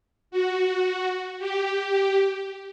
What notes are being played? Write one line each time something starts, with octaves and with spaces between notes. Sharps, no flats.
F#4
G4